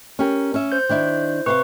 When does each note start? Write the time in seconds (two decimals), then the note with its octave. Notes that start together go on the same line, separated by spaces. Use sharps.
0.19 C#4 G4 A#4
0.54 C#4 E5
0.72 C5 G6
0.89 D#3 D4 E4
1.46 C3 B4 C5 F5 C#6